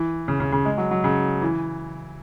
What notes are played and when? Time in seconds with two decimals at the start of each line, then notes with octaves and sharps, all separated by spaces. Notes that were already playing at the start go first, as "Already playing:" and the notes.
Already playing: E3
0.28 C#3
0.40 C#3
0.52 C#3
0.65 G#3
0.78 F#3
0.91 F#3
1.04 C#3
1.42 E3